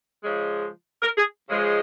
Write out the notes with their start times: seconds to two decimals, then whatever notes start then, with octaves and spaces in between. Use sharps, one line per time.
0.24 C#3 F3 G#3
1.02 A#4
1.18 G#4
1.49 C#3 F3 G#3